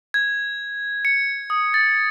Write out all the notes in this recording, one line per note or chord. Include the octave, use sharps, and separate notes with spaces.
G#6
C#7
D#6
A6